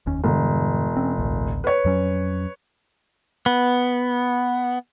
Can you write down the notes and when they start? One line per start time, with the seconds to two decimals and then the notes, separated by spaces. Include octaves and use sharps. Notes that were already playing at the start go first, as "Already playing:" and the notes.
0.06 F1 D#2 C#4
0.24 E1 G2 D3
0.97 C4 C#4
1.18 A1 D2
1.64 B4 C#5
1.85 F2 F#3 C#4
3.46 B3